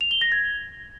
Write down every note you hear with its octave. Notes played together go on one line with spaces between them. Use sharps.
F7
G7
A#6
G#6